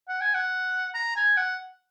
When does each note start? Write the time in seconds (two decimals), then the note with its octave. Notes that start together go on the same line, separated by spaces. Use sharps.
0.08 F#5
0.21 G#5
0.34 F#5
0.94 A#5
1.16 G#5
1.37 F#5